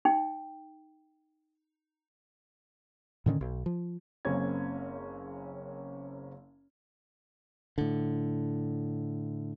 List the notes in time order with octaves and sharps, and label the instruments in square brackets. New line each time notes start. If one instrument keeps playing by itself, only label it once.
[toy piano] D#4 G5
[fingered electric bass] A2 D3 D#3 C#4
B1
F3
[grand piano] F#1 C#3 A#3 C4 C#4 G#6
[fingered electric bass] A2 D3